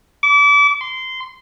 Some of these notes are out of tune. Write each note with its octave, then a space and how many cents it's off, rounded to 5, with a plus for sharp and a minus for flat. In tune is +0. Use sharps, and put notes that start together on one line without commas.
D6 -35
C6 -15